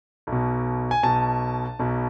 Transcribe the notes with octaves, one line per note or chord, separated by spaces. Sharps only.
B1
B2
G#5
B1 B2 A5
B1 B2